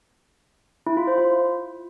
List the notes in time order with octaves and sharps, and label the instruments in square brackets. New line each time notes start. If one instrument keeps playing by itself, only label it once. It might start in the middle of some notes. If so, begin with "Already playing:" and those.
[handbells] E4
F4
C5
F4